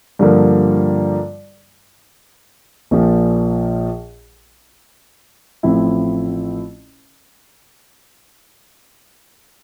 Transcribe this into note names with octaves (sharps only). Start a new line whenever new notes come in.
G2 D3 F3 A#3
A#1 A#2 F3
A1 A2 F3 C4 E4